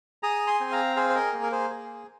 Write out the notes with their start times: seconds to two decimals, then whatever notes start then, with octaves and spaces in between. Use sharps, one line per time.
0.23 G#4 A#5 D#6
0.47 G#5 C6
0.60 C4
0.72 F5 A#5
0.96 G#4 C5 F5
1.10 C5
1.15 A#4 D#5
1.33 A#3
1.43 A#4
1.52 G#4 C5
1.70 G#4